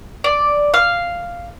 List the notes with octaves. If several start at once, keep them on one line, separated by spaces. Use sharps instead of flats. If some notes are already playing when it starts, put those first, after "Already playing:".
D5
F5